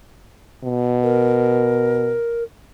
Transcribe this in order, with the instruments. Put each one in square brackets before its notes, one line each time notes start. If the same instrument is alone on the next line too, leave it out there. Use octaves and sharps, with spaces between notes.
[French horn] B2
[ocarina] A#4